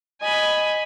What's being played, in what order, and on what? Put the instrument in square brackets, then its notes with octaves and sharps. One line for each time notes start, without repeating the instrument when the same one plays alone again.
[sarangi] D#5 [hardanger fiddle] G#5 B5